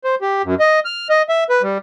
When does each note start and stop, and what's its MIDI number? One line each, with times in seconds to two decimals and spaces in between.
0.04 0.15 72
0.22 0.42 67
0.44 0.55 42
0.60 0.80 75
0.85 1.08 89
1.10 1.22 75
1.29 1.44 76
1.50 1.62 71
1.62 1.78 55